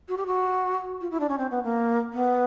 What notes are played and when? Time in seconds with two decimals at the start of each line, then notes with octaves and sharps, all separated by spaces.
0.08 F#4
0.17 G4
0.27 F#4
1.01 F4
1.11 E4
1.20 D4
1.29 C#4
1.38 C4
1.51 B3
1.64 A#3
2.13 B3